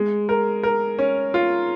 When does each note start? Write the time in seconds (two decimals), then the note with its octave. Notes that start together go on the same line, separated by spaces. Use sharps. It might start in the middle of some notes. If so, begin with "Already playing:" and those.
Already playing: G#3
0.29 A#4
0.63 A#4
0.99 C#4
1.34 F4